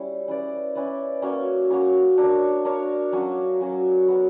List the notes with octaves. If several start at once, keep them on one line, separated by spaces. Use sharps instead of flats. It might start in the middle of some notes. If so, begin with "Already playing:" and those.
Already playing: G3 C#4 E4
C#4 E4 B4 D5
C#4 E4 B4 D5
A#3 C#4 F#4 C#5
A#3 C#4 F#4 C#5
D4 A#4 C#5
D4 A#4 C#5
F#3 C#4 F#4 C#5
F#3 C#4 F#4 C#5
B3 F#4 A#4 C#5